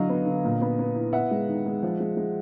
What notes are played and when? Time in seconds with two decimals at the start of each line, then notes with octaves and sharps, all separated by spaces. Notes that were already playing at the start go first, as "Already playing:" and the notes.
Already playing: D3 F#3 E4 D#5 F5
0.09 B3
0.26 D3
0.44 A#2
0.61 B3
0.79 B3
0.95 E4
1.13 B3 E5 F#5
1.31 G#3
1.48 D#3
1.66 G#3
1.83 F3
2.00 G#3
2.17 G#3